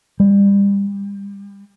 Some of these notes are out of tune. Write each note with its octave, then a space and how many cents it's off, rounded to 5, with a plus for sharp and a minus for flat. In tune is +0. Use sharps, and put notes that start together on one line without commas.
G3 +30